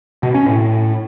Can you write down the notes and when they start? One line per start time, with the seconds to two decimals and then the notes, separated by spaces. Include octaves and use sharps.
0.23 B2
0.34 C#4
0.46 A2